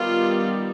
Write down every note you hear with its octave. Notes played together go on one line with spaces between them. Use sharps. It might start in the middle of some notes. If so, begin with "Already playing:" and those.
Already playing: D#3 G3 B3 F4